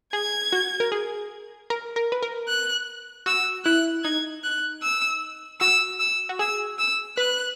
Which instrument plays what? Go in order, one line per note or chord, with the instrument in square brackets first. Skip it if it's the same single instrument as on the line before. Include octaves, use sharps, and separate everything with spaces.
[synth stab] G#4 [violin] G#6
[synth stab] F#4
A#4
G#4
A#4
A#4
B4
A#4
[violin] F#6
[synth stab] F#4 [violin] E6
[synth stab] E4 [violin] F#6
[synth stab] D#4 [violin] G#6
[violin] F#6
E6
[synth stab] F#4 [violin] E6
[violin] E6
[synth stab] F#4
[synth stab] G#4 [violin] E6
[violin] E6
[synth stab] B4 [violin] F#6